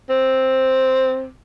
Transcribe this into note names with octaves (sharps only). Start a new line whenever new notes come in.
C4